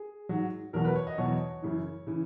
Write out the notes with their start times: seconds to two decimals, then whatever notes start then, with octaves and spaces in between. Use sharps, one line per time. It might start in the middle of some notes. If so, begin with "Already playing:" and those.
Already playing: G#4
0.29 G#2 F#3
0.73 E2 B2 F#3 A#4
0.85 B4
0.96 C#5
1.07 D#5
1.18 E2 B2 F#3 C#5
1.62 F#2 C#3 E3
2.07 C#3 E3